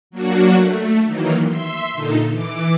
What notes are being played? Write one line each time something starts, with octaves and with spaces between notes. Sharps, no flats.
F#3 A#3 D4 F#4
A3
D#3 E3 F#3 A#3
E5 C6
A#2 D3 D#4 A4
E3 D6